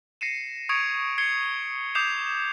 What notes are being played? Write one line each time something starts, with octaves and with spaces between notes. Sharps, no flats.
A#6 C7 C#7 D#7 E7
C#6 D#6 G#6 C#7 D7 F7
G#6 C7 C#7 G7
D6 D#6 G6 C7 E7 F7